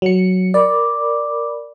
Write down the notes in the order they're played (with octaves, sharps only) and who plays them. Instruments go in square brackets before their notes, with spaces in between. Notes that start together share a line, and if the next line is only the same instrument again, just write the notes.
[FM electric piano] F#3 C#7
[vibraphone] A#4 B5 D6 [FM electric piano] D5